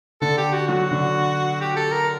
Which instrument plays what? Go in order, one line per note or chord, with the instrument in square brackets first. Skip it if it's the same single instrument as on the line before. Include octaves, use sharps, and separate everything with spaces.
[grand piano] D3 [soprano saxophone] A4
[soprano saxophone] G4
F#4
[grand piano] F#3 [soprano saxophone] F#4
[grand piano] D3
[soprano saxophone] G4
A4
A#4